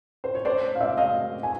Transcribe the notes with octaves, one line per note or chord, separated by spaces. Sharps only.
C5
C#5
C5 D5
F5
D5 E5
D#5 F5
G#5